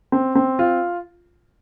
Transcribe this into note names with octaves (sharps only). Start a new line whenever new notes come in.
C4
C4
F4